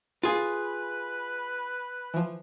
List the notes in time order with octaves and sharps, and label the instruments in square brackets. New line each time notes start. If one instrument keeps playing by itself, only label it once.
[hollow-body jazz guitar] F4 G#4 [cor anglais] B4
[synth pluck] E3 F3